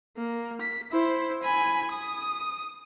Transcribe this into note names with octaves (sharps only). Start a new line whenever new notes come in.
A#3
B6
E4 C5
G#5 B5
D#6